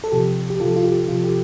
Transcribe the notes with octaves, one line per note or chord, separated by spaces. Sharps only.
A4
C3 F3 G4
G4
C3 F3 F4 A4
F4
G4
C3 F3 F4
G4